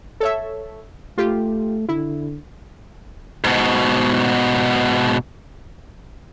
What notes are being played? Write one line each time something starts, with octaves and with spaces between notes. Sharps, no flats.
A4 C#5 E5
A3 F4 G4
D3 E4
G#2 B2